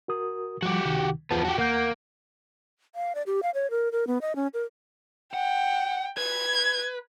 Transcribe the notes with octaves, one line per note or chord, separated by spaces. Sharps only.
F#4 A#4 D#6
F3 G3 F#4 G4
C#2 C3 D#3
E2 F3 B3 A5
F#4 G4
D#2 A#3 F#5 G6
F5
D5
G4
F5
C#5
A#4
A#4
B3
D#5
C#4
A#4
F#5 G5
B4 G#6